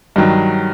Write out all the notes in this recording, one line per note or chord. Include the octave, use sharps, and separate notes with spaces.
G2 D#3 F#3